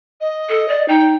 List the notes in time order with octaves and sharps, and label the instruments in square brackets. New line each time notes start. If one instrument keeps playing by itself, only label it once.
[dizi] D#5
[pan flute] A4
D5
[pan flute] D#4 [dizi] G5